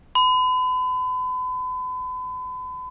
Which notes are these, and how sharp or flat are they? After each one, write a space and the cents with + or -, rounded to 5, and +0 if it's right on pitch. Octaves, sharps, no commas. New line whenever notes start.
B5 +40